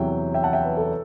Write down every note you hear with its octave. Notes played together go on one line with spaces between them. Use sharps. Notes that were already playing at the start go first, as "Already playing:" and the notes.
Already playing: E2 C3 F#3 E5 G5
E5 G5
F#5 A5
E5 G5
B4
A4